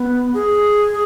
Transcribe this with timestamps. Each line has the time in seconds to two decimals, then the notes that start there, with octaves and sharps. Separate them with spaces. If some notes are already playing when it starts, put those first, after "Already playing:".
Already playing: B3
0.34 G#4